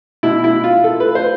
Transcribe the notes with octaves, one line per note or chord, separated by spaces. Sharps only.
B2 E4
E4
F4
A4
B4
C5